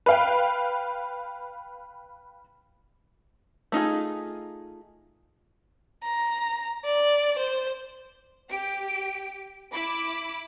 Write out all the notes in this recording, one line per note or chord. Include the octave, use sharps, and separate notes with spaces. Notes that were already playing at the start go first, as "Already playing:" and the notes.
B4 F5 G5
A3 D#4 F4 G#4
A#5
D5
C5
G4 D7
E4 B5 D6